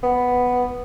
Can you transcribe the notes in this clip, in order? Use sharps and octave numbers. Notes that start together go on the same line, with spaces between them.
B3